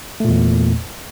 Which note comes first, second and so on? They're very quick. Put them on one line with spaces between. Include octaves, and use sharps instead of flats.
A3 A#2 E2